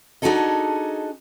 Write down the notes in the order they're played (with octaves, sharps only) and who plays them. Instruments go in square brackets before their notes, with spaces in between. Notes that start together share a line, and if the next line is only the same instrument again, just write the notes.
[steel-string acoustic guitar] D4 D#4 F#4 G#4 A4 D#5